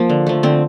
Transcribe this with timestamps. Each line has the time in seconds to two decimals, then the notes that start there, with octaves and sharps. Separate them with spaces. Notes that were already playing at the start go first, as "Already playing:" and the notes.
Already playing: F3 A#3
0.10 D3
0.27 F3 A3
0.43 D3 C4